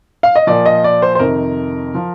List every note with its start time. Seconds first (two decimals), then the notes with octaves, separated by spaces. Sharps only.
0.23 F5
0.36 D#5
0.47 A#2 F3 D5
0.66 D#5
0.84 D5
1.02 C5
1.15 C5
1.19 F2 C3 D#3 A#4
1.95 F3